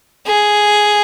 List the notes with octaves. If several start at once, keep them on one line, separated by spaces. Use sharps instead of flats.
G#4